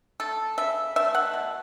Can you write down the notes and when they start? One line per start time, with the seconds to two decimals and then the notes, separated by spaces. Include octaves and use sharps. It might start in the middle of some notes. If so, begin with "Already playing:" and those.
0.20 A3 A4
0.58 C#3 E5
0.96 A3 E5
1.15 F#5
1.34 B2